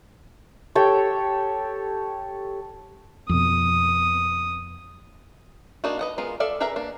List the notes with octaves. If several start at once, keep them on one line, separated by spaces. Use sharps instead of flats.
G4 A4 C#5 G5
F2 B2 D#6
A#3 D4 D#4 F4 F#4
B4 D#5 F#5
G#3 B3 F4 A#4
A4 D5 E5 F5
G#4 A#4 B4 E5 A#5
A#3 D4